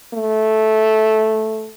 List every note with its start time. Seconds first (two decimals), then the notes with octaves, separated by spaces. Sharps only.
0.14 A3